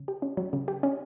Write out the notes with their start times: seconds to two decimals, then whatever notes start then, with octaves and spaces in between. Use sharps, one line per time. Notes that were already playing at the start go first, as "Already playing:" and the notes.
Already playing: C#3
0.08 G4
0.22 C#4
0.37 F#3
0.53 C#3
0.68 G4
0.83 C#4